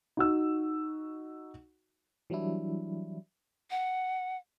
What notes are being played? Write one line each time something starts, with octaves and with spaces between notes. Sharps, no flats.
D#4 F#4 E6
E3 F#3 G3 D4 E4
F#5